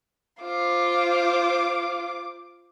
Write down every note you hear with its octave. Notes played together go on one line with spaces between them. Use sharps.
F4 C5 D6